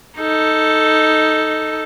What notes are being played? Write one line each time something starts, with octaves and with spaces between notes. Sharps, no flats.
D#4 A4